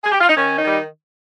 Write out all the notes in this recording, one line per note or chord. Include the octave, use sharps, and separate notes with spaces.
G#4
G4
F4
D#4
D#3 C#4
D#4
D#3 G3